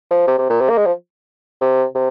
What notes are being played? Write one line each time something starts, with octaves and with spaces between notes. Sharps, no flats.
F3
C3
C3
A#2
C3
A#3
G#3
F3
C3
C3